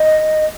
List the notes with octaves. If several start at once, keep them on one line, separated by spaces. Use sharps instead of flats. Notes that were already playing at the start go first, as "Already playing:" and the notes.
Already playing: D#5